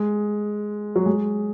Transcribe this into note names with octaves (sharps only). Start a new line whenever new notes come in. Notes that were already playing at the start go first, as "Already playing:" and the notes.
Already playing: G#3
F#3
G#3